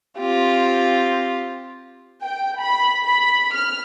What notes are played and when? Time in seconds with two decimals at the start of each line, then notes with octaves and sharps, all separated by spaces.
0.18 C4 F4 G4
2.24 G5
2.61 B5
3.03 B5
3.53 F6